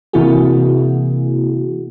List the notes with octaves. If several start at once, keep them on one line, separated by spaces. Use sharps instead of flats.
C3 E3 A#3 E4 F#4 G#4